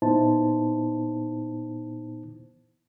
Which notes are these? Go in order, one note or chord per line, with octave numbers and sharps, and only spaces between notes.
A#2 B3 D#4 E4 C5 A5